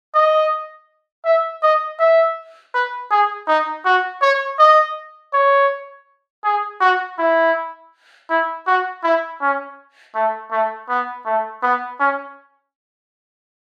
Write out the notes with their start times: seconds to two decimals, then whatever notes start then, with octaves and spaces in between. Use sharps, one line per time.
0.14 D#5
1.25 E5
1.63 D#5
2.00 E5
2.74 B4
3.11 G#4
3.48 D#4
3.85 F#4
4.22 C#5
4.59 D#5
5.33 C#5
6.44 G#4
6.81 F#4
7.18 E4
8.30 E4
8.67 F#4
9.04 E4
9.41 C#4
10.15 A3
10.51 A3
10.89 B3
11.26 A3
11.63 B3
12.00 C#4